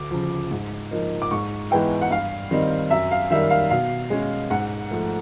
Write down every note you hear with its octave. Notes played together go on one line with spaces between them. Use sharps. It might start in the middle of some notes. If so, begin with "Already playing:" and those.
Already playing: D2 D6
C#3 F3
G#2
F3 A#3 D#4
D6
G#2 C#6
E3 G#3 B3 E4 G5
F#5
G2 F5
D#3 G3 C4 D#4
F#2 E5
F5
D#3 G3 A#3 E5
F5
B2 F5
G#3 C#4
G#2 F#5
F3 A3